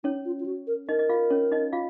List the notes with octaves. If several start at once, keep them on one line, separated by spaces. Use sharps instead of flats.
C#4 D#4 C#5
F4
F4
F#4
A#4
D#4 A#4 D#5
D#5
F4 F5
C#4 C#5
D#4 D#5
F4 F5